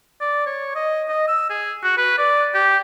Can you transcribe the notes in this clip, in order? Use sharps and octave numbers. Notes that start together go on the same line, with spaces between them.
D5
C#5
D#5
D#5
E6
G#4
F#4
B4
D5
G4